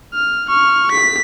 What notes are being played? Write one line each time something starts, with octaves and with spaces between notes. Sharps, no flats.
F6
C#6 F6
B6